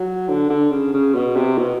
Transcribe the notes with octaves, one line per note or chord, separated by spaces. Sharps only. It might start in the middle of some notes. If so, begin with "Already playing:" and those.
Already playing: F#3
D3
D3
C#3
C#3
B2
C3
B2